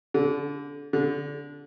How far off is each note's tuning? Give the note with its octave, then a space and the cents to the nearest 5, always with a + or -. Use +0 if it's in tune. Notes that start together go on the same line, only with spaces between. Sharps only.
D3 -25
D3 -20